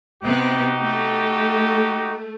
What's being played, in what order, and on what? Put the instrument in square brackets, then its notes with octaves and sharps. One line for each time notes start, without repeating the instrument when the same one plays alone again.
[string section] C3 B3 [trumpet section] D#4 F#4 G4
[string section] A3